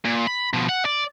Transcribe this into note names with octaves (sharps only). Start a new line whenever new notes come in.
A#2
B5
B2 F3
F#5
D5